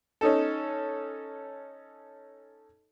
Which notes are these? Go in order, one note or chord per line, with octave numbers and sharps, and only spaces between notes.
C#4 D#4 A4